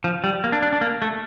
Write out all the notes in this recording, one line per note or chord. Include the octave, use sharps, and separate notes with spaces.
F3
G3
A#3
D4
D4
D4
A#3
A3